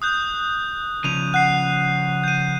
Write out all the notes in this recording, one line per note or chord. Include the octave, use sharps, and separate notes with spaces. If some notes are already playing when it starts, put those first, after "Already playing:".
D#6 F#6 G6
C#3 F3 D#7 F7
F#5 F#6 C7 D#7
G6 D#7